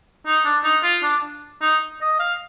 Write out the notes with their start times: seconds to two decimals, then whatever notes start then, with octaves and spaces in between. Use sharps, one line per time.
0.26 D#4
0.45 D4
0.64 D#4
0.83 F4
1.03 D4
1.61 D#4
2.01 D#5
2.19 F5